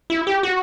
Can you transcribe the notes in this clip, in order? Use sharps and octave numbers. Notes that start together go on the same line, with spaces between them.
E4
G4
F#4